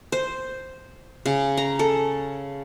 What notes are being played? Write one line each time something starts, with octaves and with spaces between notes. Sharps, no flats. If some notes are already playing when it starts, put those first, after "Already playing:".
C5
C#3
A#5
A4